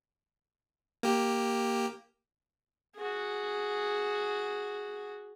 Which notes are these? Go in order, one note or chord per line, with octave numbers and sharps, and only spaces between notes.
A#3 G4
F#4 G#4